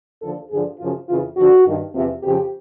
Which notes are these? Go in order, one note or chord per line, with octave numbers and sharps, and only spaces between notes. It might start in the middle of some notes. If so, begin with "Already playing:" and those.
D#2 D3 F3 A4
G2 D3 F3 G#4
F#2 C#3 F3 F4
F2 C#3 E3 F4
G2 D3 F3 F#4
G2 D#3
E2 C3 F3
F2 C#3 F3 G4